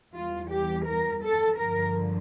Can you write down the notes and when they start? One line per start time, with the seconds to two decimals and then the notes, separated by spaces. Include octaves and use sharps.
0.14 E2 E3 G3 F4
0.51 G4
0.87 A#4
1.23 A4
1.58 G2 D3 F3 A#4